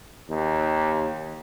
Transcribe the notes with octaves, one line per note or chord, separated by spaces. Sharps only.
D#2